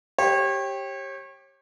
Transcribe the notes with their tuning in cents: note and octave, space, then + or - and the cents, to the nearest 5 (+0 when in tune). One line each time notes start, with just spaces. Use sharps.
G4 +0 C#5 -35